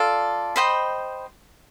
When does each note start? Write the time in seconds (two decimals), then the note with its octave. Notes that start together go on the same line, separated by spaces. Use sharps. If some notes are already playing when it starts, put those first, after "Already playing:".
Already playing: F4 A4 D5
0.56 C5 D#5 G5 B5